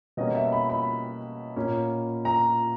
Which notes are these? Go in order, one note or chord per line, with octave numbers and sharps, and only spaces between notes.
B2 G3 A#3 C#4 D#5
E5
B5
B5
A#2 A#3 C#4
A#5